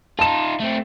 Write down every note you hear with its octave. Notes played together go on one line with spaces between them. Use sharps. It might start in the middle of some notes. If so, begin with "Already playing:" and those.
D#4 F4 A5 E7
A3 C4